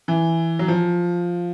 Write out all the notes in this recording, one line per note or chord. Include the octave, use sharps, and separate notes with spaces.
E3
F#3
F3